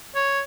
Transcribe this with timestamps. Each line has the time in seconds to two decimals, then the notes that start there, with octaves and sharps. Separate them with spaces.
0.15 C#5